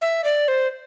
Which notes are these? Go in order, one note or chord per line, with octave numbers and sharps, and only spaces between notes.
E5
D5
C5